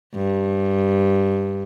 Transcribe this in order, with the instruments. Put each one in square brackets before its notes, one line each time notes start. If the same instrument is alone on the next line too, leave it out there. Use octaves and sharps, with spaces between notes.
[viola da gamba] G2